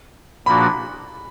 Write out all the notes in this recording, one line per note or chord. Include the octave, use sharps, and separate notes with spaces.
A#2 F3 A#3 D4 F#4 B5